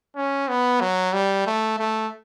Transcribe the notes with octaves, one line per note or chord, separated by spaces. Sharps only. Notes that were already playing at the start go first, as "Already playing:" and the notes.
C#4
B3
F#3
G3
A3
A3